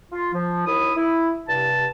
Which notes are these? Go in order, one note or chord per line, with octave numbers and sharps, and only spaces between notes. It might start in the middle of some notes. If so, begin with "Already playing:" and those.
F4
F3
D#2 E4 D#6
E4
G2 C3 A5